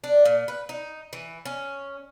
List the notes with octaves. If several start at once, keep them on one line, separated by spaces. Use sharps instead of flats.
D4
A#2
B4
D#4
E3
C#4